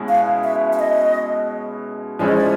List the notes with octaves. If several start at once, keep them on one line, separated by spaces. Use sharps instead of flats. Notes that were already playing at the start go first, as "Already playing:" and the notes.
Already playing: B2 G#3 C#4 E4
F5
E5
E5
D#5
F3 G#3 C#4 E4 D5
D#5
D5